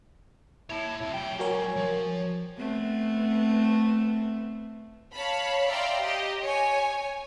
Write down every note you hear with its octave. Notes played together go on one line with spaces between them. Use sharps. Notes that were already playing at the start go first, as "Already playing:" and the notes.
E4 C#5 A5
C2 E4
F#3 G4 G5
F#4 A#4 C#5 G#5
F3
A3 B3 C4
C#5 F5 A5 B5
D5 E5 F5 G5 A#5 C6
G4 D#5
C#5 G#5